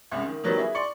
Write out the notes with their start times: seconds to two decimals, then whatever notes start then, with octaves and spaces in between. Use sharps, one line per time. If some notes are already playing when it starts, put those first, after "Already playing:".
0.11 C2 F#2 G#3
0.26 D#3
0.44 D#3 F#3 G3 B3
0.58 E4 G#4
0.74 D5 C6 C#6 C#7